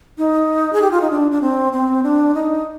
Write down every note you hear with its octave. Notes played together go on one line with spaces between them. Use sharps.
D#4
G#4
G4
F4
D#4
D4
D4
C4
C4
D4
D#4